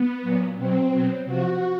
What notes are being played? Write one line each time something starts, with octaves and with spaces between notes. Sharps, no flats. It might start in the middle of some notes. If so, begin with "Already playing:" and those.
Already playing: B3
A#2 F#3
B2 C4
F#3
B2 F#3
C3 F3 F#4